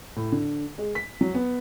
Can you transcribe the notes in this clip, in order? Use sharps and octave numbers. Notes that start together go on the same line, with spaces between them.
A2
D3
G#3
B6
F#3
B3